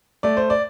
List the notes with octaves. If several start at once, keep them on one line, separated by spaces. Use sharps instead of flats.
A3 D5
C5
D5